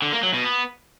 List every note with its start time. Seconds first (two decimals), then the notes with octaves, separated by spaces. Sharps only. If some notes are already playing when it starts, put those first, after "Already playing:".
0.02 D3
0.13 A#3
0.23 F#3
0.34 B2
0.44 B3